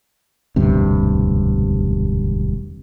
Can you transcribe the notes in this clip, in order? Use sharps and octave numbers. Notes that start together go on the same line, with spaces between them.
E1 D2 G2 C3